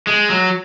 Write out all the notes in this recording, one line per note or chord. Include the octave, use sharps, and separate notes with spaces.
G#3
F#3